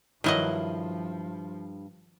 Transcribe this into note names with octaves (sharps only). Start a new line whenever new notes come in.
G2 D#3 F3 F#3 E4 D#5